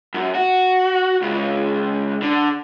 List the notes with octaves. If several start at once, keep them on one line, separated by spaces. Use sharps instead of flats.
F#2
F#4
C#2
D3